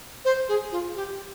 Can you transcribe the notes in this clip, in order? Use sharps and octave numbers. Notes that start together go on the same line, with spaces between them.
C5
G#4
F4
G4